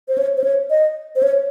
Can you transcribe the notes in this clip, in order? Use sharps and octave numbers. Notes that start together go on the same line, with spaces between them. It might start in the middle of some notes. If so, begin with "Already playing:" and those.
C5
C#5
C5
C#5
D#5
C5
C#5